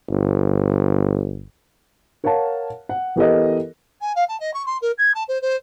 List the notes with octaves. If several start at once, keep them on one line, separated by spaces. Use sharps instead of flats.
G1
A#4 C#5 F5 F#5 A5
F#5
E3 B3 G4 A4 A#4 D#5
G#5
F5
A5
D#5
C#6
C6
A#4
G#6
A5
C5
C5